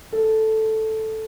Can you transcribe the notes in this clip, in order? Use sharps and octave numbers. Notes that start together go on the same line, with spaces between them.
A4